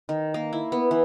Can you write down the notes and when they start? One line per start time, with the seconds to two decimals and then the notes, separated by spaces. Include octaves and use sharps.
0.09 D#3
0.34 A#3
0.53 E4
0.72 B3
0.91 E3